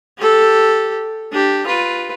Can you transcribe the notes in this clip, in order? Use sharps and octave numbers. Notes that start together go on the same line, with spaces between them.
G4 A4
D4 G4
F4 B4